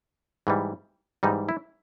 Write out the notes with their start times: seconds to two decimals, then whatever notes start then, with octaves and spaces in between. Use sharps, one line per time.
0.47 G#2 E3 G3
1.23 G#2 E3 G3 D#4
1.49 E4